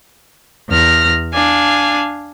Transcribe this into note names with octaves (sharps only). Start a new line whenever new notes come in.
E2 F6 A#6
D4 F5 G#5